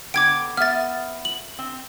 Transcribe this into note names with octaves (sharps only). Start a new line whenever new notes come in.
D3 B3 G5 D6 G#6 D7
B3 E5 F6 A6
F#7
C4